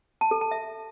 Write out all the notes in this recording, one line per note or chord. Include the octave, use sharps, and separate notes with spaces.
A5
A4
A5
E5